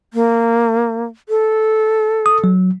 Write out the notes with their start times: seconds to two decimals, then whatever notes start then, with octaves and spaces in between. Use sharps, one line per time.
0.14 A#3
1.29 A4
2.26 D#6
2.44 F#3